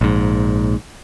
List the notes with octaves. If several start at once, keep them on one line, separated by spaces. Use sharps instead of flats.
A#1 G#2